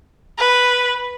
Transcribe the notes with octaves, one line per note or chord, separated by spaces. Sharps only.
B4